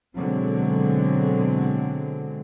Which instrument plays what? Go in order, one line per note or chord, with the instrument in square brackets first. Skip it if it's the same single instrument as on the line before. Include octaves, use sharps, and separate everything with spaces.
[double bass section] B2 D3 F#3 G#3 C4